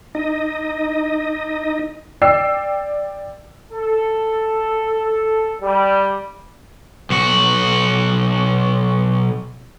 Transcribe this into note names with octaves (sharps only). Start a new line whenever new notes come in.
D#4 D#5
D5 G5 E6 C7
A4
G3
B1 F#4